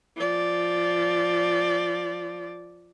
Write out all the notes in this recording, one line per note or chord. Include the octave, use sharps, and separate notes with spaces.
F3 D5